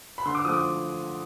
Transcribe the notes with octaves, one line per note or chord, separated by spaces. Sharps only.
B5
D3 C6
D6
F3 A3 D6 D#6